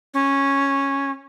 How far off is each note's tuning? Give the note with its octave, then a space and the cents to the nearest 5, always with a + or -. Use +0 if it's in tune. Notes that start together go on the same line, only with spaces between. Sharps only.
C#4 -10